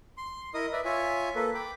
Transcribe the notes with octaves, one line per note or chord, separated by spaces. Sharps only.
C6
E4 A#4 D#5 D#6
B4 D5 E5
F4 C#5 E5 G#5
A#3 A4 B4
G5 B5 D6